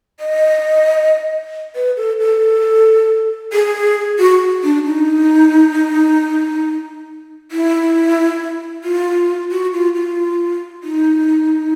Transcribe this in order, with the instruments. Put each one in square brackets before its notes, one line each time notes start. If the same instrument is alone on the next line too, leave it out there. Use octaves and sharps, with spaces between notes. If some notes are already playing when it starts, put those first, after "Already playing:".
[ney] D#5
B4
A4
A4
G#4
F#4
D4
D#4
E4
F4
F#4
F4
F4
D#4